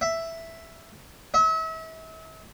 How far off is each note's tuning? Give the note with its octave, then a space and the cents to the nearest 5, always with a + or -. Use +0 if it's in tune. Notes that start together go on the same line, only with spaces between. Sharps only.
E5 +0
E5 -40